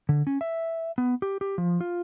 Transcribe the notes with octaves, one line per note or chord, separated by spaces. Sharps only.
D3
C#4
E5
B3
G4
G4
F3
F4